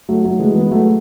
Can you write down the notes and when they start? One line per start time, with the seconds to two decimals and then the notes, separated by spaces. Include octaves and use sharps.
0.09 F#3 A3
0.24 F#3 A3
0.39 E3 G#3
0.55 G#3 B3
0.71 F#3 A3